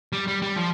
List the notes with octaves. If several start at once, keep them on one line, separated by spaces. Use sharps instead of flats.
G3
G3
G3
F3